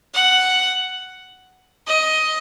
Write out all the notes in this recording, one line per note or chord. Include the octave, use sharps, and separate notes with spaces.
F#5
D#5